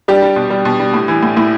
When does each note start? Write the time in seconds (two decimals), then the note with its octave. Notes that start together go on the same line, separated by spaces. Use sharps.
0.08 G3 D4 G4
0.22 G3
0.36 B2
0.50 G3
0.65 B2
0.80 G3
0.94 A2
1.08 E3
1.23 A2
1.37 A2 E4